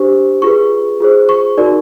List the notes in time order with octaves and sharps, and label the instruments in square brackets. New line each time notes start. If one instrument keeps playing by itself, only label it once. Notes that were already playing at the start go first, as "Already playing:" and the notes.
Already playing: [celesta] D4 G4 C5 C#6
F4 G#4 B4 C#6
F4 G#4 C5
C#6
D#4 F#4 A#4 D5